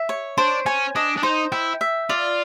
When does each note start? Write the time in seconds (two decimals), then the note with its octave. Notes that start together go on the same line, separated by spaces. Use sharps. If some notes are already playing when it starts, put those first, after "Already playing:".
Already playing: E5
0.09 C#5
0.38 D4 C5
0.66 C#4 G#5
0.95 D4 D#5
1.17 D4
1.23 D#4 C5
1.52 E4 G5
1.81 E5
2.09 F4 D5